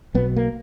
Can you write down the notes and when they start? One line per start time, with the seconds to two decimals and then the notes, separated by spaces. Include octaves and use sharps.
0.14 B1 B2 B3
0.36 A#3